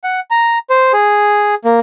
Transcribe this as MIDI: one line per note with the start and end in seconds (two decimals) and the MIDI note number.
0.04 0.20 78
0.31 0.58 82
0.70 0.92 72
0.93 1.55 68
1.65 1.80 58